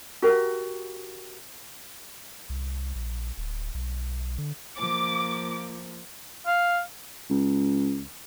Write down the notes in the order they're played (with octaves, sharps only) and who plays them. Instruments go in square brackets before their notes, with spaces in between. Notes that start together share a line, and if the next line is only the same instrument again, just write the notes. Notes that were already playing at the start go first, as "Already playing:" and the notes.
[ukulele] F#4 G4 A#4
[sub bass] C2
A#1
D1
B1
D3
[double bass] F3 A#3 [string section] D6
[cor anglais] F5
[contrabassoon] C#2